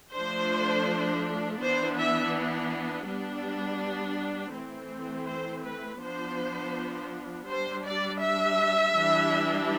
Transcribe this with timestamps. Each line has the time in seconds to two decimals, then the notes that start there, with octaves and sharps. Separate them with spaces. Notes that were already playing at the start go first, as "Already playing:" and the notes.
0.13 F3 A3 D4 C5
1.60 E3 B3 D4 C5
1.97 E5
3.07 G3 B3 D4
4.54 E3 A3 C4
5.28 C5
5.64 B4
6.01 F3 B3 D4 C5
7.48 G3 D4 C5
7.84 D5
8.21 E5
8.94 E3 G3 D4